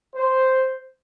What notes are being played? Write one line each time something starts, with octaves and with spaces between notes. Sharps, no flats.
C5